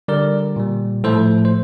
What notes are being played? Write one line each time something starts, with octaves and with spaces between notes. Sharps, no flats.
D3 G3 A#4 D5
A#2 G3
A2 F3 A3 A4 C5
C5